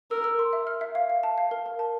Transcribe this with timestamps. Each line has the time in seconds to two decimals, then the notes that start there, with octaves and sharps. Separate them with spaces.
0.11 A#4 E6
0.24 E6
0.39 C6
0.53 E5
0.67 F6
0.81 E5
0.95 F5
1.10 F5
1.23 A5
1.38 F5
1.51 A#4
1.66 A#4
1.79 A5